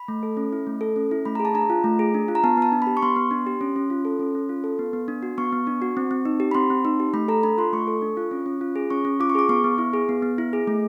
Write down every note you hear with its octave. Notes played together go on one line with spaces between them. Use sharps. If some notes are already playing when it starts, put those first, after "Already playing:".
Already playing: B5
A3
A4
C#4
E4
A3
A4
C#4
E4
A3 B5
G#4 A#5
A5
D4 A#5
F4
A3
G#4
D4
F4
A#5
B3 A5
B3 A5
D4
G4 B5
C#6
B3 C6
B3
D4
G4
C#4
C#4
F4
A4
C#4
C#4
F4
A4
B3
B3
D4
F#4
B3 C#6
B3
D4
F#4
C4
C4
D#4
G4
B5
C4 C6
C4
D#4
G4
A3 B5
A4 A#5
D4 B5
F4 C6
A3 C#6
A4
D4
F4
C#4
C#4
F4
G#4
C#4 C#6
C#4
F4 D6
C#6
G#4 D6
B3 C#6
B3
E4
G#4
B3
B3
E4
G#4
A3